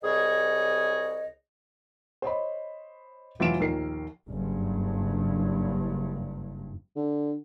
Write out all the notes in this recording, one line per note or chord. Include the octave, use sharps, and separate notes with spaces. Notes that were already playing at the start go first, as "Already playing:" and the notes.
C2 G#4 C#5 D#5
C5 C#5 D#5 B5
F1 E3 F#3 F4 D7 E7
A#1 D#2 A#4 C7
F#1 G2
D3